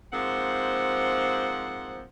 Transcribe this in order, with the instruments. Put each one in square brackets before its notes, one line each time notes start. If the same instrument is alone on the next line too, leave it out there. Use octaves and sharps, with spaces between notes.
[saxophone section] G#2 F3 A#3 C4 F#5